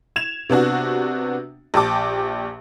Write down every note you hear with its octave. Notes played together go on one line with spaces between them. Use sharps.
G#6 E7 F7
C3 B3 D4 F#4
A#1 G4 A5 D6